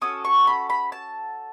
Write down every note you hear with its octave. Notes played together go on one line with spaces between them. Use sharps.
C#4 F#4 A4 D#6
C#6
B5
B5
A5